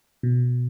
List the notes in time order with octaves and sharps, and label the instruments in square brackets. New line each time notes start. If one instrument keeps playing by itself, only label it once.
[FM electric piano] B2